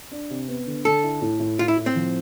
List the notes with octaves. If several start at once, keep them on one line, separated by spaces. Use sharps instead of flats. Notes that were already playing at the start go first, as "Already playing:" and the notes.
D4
C3
B3
D3
D3 A4
E4
A2
A2
A2 F4
E4
A2
C4
F3